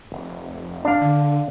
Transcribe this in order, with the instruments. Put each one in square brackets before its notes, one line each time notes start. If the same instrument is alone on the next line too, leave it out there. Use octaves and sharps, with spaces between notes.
[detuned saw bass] F1
[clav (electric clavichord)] D4 F5
[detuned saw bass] D3